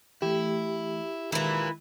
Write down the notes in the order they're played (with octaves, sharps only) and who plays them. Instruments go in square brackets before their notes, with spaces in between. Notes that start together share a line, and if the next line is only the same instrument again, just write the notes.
[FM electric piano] E3 A3 [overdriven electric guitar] E4 [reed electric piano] G4
[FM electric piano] D#3 G#3 [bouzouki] E3 E4 [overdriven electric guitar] F4 A#4